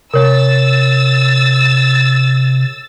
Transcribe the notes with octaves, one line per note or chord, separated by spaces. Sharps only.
C3 A#4 C#5 E6 A6